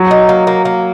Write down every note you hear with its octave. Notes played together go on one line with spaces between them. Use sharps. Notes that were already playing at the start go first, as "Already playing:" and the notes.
Already playing: F#3
D#4
A#3
A#3
A#3